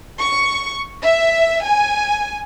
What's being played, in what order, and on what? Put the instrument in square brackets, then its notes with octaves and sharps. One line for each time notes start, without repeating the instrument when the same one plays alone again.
[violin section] C#6
E5
G#5